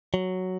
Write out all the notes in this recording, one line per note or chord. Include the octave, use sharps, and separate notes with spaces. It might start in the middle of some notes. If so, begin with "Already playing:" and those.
F#3